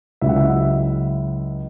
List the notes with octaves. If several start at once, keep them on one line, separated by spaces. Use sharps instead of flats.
C#2 C#3 F#3 C#4 E4 E5
F#5
E5